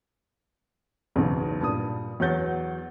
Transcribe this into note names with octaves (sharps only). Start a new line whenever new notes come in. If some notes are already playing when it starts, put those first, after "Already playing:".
B1 E2 G#2 C#3
G2 A#2 D#6
E2 F#3 C#5 F#5 G6 A6